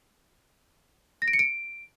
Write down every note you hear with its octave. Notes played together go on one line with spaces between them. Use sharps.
A#6
D7
C#7
D7